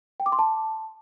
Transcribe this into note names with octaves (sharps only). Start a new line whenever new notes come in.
G5
D6
C6
A5